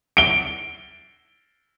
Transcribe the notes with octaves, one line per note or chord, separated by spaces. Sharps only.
D7 G7